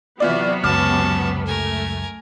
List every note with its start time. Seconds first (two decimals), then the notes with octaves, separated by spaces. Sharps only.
0.20 C3 E3 F#3 B3 F4 F#4 D5
0.64 C#2 F#2 C#4 A5 D6 F6
1.46 A3 A#4 G#5